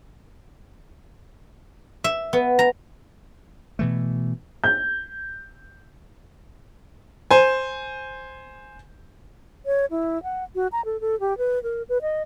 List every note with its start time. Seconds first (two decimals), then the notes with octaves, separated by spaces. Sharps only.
2.04 E5
2.33 B3
2.59 A#5
3.79 B2 E3 A3
4.64 G6
7.31 C5 G#5
9.66 C#5
9.91 E4
10.23 F#5
10.55 F#4
10.72 A#5
10.85 A4
11.01 A4
11.20 G4
11.38 B4
11.63 A#4
11.89 B4
12.02 D#5